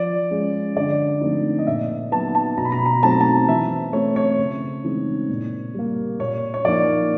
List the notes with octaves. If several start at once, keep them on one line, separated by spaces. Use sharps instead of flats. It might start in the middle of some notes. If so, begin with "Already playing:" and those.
Already playing: F3 D5
G#3 C#4
D3 D5
F3 A3 C4 D#4
D#5
A#2 E5
F#3 B3 D#4 A5
A5
B2 A#5
B5
A#5
B5
A#5
F#3 A3 C4 D#4 A5
A#5
A5
E3 E5
A3 C4 C#5
C#5
C#3
E3 G#3 C4 D#4
A#2
G3 A#3
A#2 C#5
C#5
F3 A#3 D#4 D5